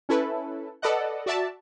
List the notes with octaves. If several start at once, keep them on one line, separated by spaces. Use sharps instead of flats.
C#4 E4 A4 B4
A4 B4 D5 D#5 F#5
F#4 D5 E5 A5